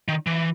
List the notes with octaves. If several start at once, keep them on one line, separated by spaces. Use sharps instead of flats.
D#3
E3